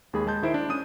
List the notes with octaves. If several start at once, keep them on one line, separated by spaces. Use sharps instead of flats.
D#2 G#3 G#4 B5
G#3 A5 G6
D#3 E4 C5 D7
D4
C#4 D#6 D#7